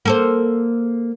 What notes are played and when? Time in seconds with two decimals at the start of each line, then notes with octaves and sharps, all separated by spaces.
0.05 A#3 A4 C5